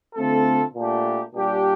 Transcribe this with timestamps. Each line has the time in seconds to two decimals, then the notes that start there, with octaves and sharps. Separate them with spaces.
0.15 D3 A3 C4 F4 A4
0.74 A#2 A3 D4 G4
1.35 A#2 G3 D4 G4